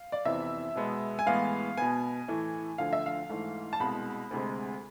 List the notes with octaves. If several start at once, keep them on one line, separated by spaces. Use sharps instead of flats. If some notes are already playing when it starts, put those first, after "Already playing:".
Already playing: F5
D5
F2 C3 E3 B3 E5
B2 G#3 B3
G#5
A2 E3 G#3 B3 F5
B2 B3 G#5
A2 E3 A3
D2 D3 F3 F5
E5
F5
G#2 E3 A3
A5
C2 B2 G#3 B5
D2 C3 G#3